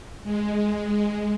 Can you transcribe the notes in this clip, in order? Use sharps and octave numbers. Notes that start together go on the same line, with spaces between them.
G#3